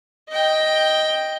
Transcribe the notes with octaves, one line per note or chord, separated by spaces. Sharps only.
D#5 G5